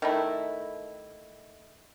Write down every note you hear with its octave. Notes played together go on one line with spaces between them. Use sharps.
D#3 A3 E4